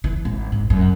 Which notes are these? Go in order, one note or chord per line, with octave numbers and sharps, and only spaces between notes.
E3
G#1
G#2
F#2